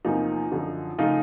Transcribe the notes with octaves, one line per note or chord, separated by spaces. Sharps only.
E2 C3 F3 A#3 D#4
F#2 D3 F3
C#3 F3 A3 D#4 F4